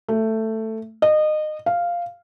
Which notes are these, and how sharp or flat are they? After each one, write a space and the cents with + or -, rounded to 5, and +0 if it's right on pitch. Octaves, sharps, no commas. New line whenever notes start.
A3 +10
D#5 -25
F5 -5